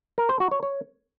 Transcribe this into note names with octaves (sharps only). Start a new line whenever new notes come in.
A#4
C5
F#4
C#5
C#5